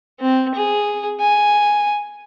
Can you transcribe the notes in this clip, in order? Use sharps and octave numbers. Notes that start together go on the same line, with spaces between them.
C4
G#4
G#5